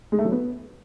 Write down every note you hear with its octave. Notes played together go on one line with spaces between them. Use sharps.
G#3
A3
F#3
B3